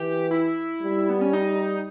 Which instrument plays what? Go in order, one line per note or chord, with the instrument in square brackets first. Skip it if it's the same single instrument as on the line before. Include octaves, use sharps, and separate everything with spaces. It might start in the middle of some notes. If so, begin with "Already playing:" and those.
Already playing: [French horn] E3 [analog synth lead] G4
[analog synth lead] E4
[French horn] G3
[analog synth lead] B3
C#4
D#4